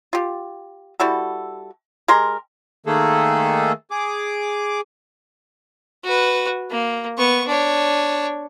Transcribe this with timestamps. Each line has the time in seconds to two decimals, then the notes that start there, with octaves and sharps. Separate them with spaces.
0.13 F4 G4
1.00 G3 E4 F#4 A4
2.08 G#3 G4 A#4 C6
2.86 D#3 A3 A#3 G#4 A4
3.91 G#4 D6
6.04 F#4 B4
6.71 A#3
7.18 B3 C#6
7.47 D4 C#5